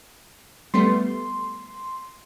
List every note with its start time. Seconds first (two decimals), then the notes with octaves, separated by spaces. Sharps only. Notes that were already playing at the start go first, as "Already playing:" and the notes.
0.74 G3 A3 B3 C6